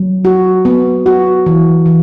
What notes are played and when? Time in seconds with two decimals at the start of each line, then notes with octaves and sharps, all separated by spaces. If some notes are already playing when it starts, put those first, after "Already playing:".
Already playing: F#3
0.25 F#4
0.65 B3
1.06 F#4
1.46 E3
1.86 E3